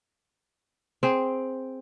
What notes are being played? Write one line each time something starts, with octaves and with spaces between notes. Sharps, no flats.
C4 G#4